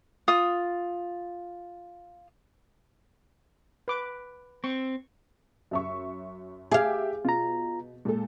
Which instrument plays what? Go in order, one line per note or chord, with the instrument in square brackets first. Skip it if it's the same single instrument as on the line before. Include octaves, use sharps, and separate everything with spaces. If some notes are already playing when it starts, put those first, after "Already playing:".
[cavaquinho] F4 D#6
[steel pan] B4 D6
[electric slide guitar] C4 [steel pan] C#6
[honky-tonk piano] F#2 E5 C#6
[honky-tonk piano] G4 E5 D6 [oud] G#4 F5
[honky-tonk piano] B2 [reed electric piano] F4 A#5
[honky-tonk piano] A#2 A4 [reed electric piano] G#3